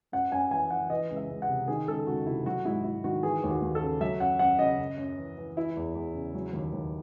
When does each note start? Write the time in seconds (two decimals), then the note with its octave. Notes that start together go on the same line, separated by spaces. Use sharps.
0.12 F#2 F#5
0.32 F#2 G#5
0.51 E3 G#5
0.70 E3 F#5
0.90 E3 D#5
1.10 C#2
1.16 E5
1.29 C#2
1.42 F#5
1.48 C3
1.68 D#3 G#4
1.87 C#2 A4
2.07 C#2 F#4
2.26 C3 E4
2.46 F#3 F#4
2.65 G#2 E4
2.84 G#2 E4
3.04 D#3 F#4
3.23 E3 G#4
3.43 D#2
3.50 F#4
3.62 D#2
3.75 A4
3.82 C#3
4.01 F#3 E5
4.20 F#2 F#5
4.39 F#2 F#5
4.59 C#3 D#5
4.78 F#2
4.98 F#2
5.18 E3
5.38 E3
5.57 E3 E4
5.76 E2
5.95 E2
6.14 C#3
6.35 F#3
6.53 D#2
6.73 D#2